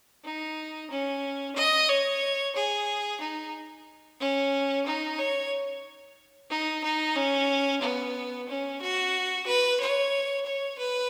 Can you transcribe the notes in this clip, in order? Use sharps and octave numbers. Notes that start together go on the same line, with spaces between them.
D#4
C#4
D#5
C#5
G#4
D#4
C#4
D#4
C#5
D#4
D#4
C#4
B3
C#4
F#4
B4
C#5
C#5
B4